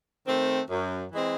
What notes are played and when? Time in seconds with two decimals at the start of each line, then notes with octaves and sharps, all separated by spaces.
0.27 D#3 A3 C4
0.70 F#2
1.12 E3 G#3 C4